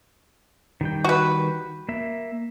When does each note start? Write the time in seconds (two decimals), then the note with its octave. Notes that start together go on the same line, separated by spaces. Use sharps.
0.81 D#3 G3 G5
1.04 F#4 B4
1.89 A#3 E5